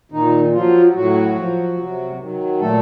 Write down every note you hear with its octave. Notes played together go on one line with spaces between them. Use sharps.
A#2 D#3 D#4
F3 F#3 F4
A2 F#3 F#4
F3
C3
D#3 F#3
A#2 A3 A4